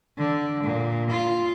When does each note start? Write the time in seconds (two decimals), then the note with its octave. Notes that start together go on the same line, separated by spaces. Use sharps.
0.18 D3
0.63 A#2
1.09 F4